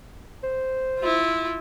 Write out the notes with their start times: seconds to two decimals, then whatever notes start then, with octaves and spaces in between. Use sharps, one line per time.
0.43 C5
0.99 E4 F4